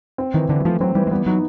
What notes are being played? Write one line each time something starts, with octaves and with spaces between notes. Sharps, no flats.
C4
D#3 E3
D3 E3
F#3
F3 A3
F#3 C4
E3 G3
G#3
G3 B3
F#3 D#4